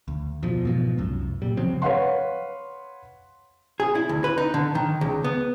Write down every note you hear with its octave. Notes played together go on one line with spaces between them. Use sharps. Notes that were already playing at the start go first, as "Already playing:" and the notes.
D2
E2 B2 F3
G#2 B2 F3
C2 F#2
A#2 G3
C#3 F3 F#3 C4
B4 C#5 F5 F#5 C6
G#4
E4
D2
B4
D#4
D3
D#3
C#2
B3